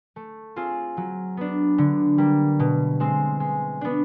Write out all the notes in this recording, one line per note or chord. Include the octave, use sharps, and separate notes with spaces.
A3
C4 F4 G#4
F#3
B3 D4
D3
G3 A#3
B2
G#3 C4
G#3
B3 D4